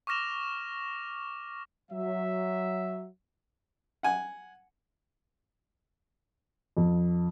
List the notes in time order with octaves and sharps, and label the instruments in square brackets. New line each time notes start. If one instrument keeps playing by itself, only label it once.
[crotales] C#6 D6 F6 A#6 E7 F7
[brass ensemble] F#3 E5
[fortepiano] F#5 G#5
[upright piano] F2